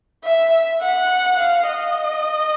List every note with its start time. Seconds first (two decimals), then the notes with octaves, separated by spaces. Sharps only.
0.24 E5
0.82 F#5
1.38 F5
1.68 D#5